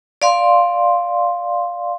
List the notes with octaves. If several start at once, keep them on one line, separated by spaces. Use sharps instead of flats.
D5 F5 C6